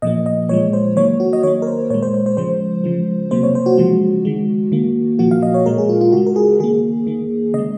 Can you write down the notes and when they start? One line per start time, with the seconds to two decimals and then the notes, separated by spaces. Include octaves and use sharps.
0.02 A#2 F3 A#3 D#5
0.26 D#5
0.49 A#2 F3 G#3 C#5
0.73 C5
0.96 D#3 F#3 A#3 C#5
1.20 F#4
1.33 D#5
1.43 D#3 A#3 C#5
1.62 A#4
1.67 C5
1.90 A#2 G#3 C#5
2.02 C5
2.14 C5
2.26 C5
2.37 C#3 F3 G#3 C5
2.84 C#3 F3 G#3
3.31 C3 F#3 A#3 C5
3.43 C#5
3.55 C5
3.66 F#4
3.78 C#3 F3 G#3 F#4
4.25 D#3 G#3
4.72 D#3 A#3
5.19 A#2 F3 A#3 F#4
5.31 F5
5.43 D#5
5.54 C#5
5.66 A#2 G#3 A#4
5.78 G#4
5.89 F4
6.01 F4
6.12 C#3 G#3 F#4
6.27 A#4
6.36 G#4
6.60 D#3 A#3 G#4
7.07 D#3 A#3
7.54 C#3 G#3 D#5